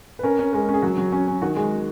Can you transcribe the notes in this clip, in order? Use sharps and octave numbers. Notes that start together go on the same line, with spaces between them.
B4
C#4 A#4
C#4
G#3 A#4
C#4
G#4
F#3 F#4
F#3
C#4
C#4
D#3 F#4
G#3